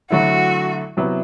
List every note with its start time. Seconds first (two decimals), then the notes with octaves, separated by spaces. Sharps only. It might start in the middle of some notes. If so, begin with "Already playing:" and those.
0.10 D3 F#3 A3 E4 F#4
0.97 C3 F#3 B3 E4